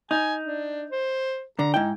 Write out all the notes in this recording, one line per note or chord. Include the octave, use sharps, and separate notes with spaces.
D#4 G#5
D4
C5
D3 A#5
G#2 D#4 E4 G5